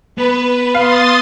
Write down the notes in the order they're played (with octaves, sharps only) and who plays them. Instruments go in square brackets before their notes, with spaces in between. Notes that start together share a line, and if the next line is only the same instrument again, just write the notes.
[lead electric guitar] B3 [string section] B4
[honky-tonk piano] F5 [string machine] C6 D#6 A6